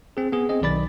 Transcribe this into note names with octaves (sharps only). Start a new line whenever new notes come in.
C4 G#4
B3 G#4
C4 G#4 D#5
B1 D#3 D5 B5 A6